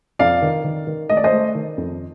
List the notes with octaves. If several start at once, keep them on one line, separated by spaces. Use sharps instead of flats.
F2 D5 F5
D#3
D#3
D#3
A3 D#5
D5
C5 D#5
A3
D#3
F2